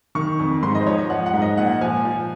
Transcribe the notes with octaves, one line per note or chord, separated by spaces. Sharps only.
D#3 C#6
F2
G#2 C6
D#5
C5
F3 C#5
D#5
F3 F#5
F#5
G#2
D#5
A#2 F#5
F3 G#5
F3